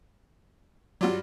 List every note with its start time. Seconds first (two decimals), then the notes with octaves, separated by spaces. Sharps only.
1.01 G2 F#3 F4 F#4 D5